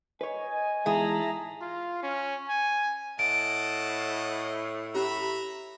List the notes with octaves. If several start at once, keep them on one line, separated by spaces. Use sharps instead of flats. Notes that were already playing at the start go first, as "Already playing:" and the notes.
B4 C#5 D#5 G#5
E2 G#2 E4 G#4 A5 A#5
F4
C#4
G#5
A2 D#5 F#5 A5 D7
C#4 G4 E5 A#5 B5